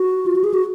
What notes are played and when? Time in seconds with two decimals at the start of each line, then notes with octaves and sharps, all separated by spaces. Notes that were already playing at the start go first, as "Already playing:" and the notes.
Already playing: F#4
0.26 F4
0.35 F#4
0.44 G#4
0.54 F#4